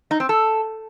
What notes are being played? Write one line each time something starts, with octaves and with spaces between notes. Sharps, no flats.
D#4
C4
A4